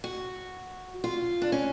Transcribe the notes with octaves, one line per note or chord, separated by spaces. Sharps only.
F#4
F4
D4
C#4